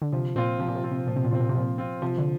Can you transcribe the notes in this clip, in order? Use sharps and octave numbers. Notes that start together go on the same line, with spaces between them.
D3
C3 F3
A#2 C4 F4
C3 F3
A#2
C3
C4 F4
C3
A#2 F3
C3
A#2
C3 C4 F4
A#2
C3
A#2 F3
C4 F4
C3 F3
D3